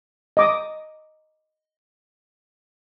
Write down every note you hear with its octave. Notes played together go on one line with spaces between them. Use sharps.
D#5 D6 D#6